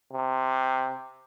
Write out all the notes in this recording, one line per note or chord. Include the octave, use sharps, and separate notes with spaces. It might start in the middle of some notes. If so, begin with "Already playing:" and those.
C3